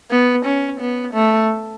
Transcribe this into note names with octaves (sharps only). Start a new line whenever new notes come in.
B3
C#4
B3
A3